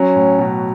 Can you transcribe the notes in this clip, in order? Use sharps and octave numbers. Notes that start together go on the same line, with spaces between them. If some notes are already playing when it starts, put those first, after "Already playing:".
Already playing: F#3 C#4
A2
B2